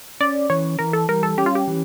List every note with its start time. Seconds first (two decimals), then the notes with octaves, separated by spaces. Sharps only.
0.21 C#4 D5
0.50 E3 C#5
0.79 E3 A#4
0.93 A4
1.09 G3 A#4
1.23 A4
1.38 C#4 G4
1.46 F4
1.55 G4
1.67 E3